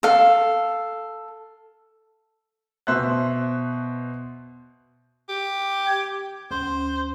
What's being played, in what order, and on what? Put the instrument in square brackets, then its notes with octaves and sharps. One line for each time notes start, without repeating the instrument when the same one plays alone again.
[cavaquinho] A4 F5
[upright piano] B2 C5 E5 F#6
[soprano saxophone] G4
[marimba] G5 G#6
[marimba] D2 C#4 C6 [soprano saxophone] C5